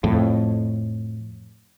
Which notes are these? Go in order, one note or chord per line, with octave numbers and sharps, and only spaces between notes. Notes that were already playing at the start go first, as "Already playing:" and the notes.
F2 A2